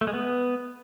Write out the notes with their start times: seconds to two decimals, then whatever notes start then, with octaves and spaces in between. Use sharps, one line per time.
0.01 A3
0.07 G#3
0.13 B3